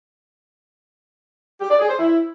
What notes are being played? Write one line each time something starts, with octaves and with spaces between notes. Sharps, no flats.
G4
D5
G#4
C5
E4